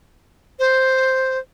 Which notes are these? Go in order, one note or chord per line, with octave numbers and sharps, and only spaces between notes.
C5